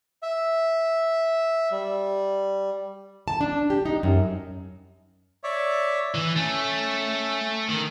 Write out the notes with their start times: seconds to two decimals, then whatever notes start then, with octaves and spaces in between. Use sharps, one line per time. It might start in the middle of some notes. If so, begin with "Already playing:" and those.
0.23 E5
1.72 G3
3.28 A5
3.41 D4
3.70 G4
3.85 D#4
4.03 F#2
5.44 C#5 D5 E5
6.15 E3
6.36 A3 C#4
7.69 D#3